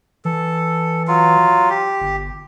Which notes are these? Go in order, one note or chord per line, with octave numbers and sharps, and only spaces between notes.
E3 A4
F#3 F4
G4
G1